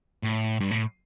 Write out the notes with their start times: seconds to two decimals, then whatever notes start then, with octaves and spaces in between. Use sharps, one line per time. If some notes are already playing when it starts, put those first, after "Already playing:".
0.23 A2
0.60 G2
0.71 A2